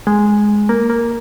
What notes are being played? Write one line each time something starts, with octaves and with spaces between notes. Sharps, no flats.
G#3
A#3
A#3